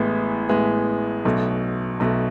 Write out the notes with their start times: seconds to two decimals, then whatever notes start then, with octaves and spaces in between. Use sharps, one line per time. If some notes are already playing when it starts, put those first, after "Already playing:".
Already playing: A1 A2 E3 G#3 B3
0.49 A1 A2 E3 G#3 B3
1.25 B1 B2 A3
2.00 B1 B2 A3